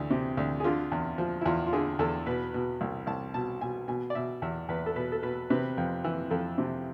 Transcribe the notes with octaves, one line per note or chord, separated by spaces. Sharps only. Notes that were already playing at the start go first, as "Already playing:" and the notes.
Already playing: D2 E3
C3
D2
G#4
D3 F4
E2
F3
E4
E2 F4
F4
D3 G#4
E2 A4
B2 B4
B2
C2
C2 A5
B2 A5
B2 G#5
B2 G#5
D5
B2 E5
E2 E5
E2 B4
A4
B2 B4
A4
B2 B4
C3 B4
F2
E3
F2 A4
C3